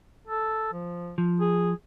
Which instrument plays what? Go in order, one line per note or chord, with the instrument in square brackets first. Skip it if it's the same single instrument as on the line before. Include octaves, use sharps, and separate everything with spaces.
[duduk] A4
F3
[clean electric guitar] F3
[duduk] G#4